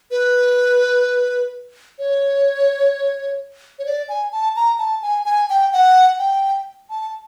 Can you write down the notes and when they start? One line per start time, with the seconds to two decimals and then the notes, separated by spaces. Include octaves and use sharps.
0.11 B4
1.99 C#5
3.79 C#5
3.86 D5
4.09 G#5
4.32 A5
4.56 A#5
4.79 A5
5.02 G#5
5.25 G#5
5.50 G5
5.73 F#5
6.19 G5
6.90 A5